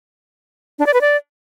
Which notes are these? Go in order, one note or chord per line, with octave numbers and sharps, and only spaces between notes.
D4
D5
B4
D5